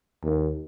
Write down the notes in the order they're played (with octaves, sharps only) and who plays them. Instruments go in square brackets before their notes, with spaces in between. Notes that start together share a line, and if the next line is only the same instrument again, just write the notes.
[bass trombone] D#2